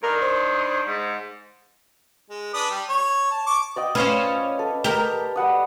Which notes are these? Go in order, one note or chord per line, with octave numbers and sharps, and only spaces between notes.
G2 D4 D#4 A#4
C5
G#2
G#3
D4 B4 D#6
G3
C#5
A5
C#6 D6
D5 D#5 G5
C#4 F4 B4 C5
A4
G4 A#4 G5
G3 F#5 D#6